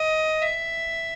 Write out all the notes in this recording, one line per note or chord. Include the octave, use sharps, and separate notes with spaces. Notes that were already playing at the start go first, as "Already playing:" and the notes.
Already playing: D#5
E5